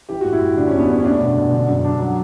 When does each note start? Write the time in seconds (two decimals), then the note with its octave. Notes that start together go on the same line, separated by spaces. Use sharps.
0.09 E3 G4
0.21 A2 F#4
0.32 E4
0.41 A2
0.57 D3 D4
0.67 C#4
0.73 E2
0.79 B3
0.88 E2 C#4
1.00 C#4
1.04 A3 D4
1.20 B2
1.36 B2
1.53 D3
1.68 F#2
1.85 D4
2.00 F#3